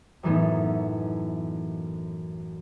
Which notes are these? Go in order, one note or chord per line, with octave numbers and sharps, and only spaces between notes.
F#2 A2 E3 A3 B3 D#4